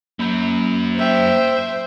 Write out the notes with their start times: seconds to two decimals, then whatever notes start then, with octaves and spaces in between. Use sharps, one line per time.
0.19 F#2 F#3 A#3 B5 G6
0.98 C5 E5 G5